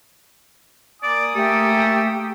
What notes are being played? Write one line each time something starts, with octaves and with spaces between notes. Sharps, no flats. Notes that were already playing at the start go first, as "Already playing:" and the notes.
A#3 D5 G#5 D#6
A3 G4 A4